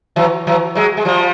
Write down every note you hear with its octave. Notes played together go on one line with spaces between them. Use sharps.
E3 F#3
E3 F#3
F#3 G#3
G#3
F3 G3